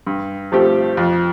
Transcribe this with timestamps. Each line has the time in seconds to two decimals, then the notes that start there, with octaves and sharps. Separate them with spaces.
0.07 G2
0.52 F3 A3 C4 G4
0.97 F2